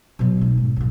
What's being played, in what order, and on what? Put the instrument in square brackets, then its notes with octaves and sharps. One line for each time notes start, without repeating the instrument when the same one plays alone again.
[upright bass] B2 F#3
G#3 D#4
G#2
D2 A#2